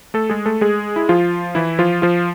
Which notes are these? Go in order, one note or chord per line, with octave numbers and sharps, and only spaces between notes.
A3 A4
G#3 G#4
A3 A4
G#3 G#4
E4
F3 F4
E3 E4
F3 F4
F3 F4